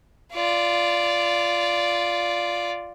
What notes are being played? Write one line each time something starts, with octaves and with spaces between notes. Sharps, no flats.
F4 D5